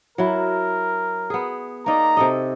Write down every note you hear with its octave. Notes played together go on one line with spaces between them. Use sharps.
F#3 E4 A#4
B3 G#4
A#3 D#4 D5 A#5
C3 A4 D#5